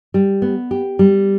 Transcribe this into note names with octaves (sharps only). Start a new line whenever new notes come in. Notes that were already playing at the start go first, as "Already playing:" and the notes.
G3
B3
G4
G3